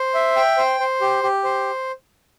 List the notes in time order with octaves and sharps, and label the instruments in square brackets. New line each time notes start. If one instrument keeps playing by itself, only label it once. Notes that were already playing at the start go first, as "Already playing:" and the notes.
Already playing: [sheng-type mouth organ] C5
E5
G5
C5
C5
G4
G4
C5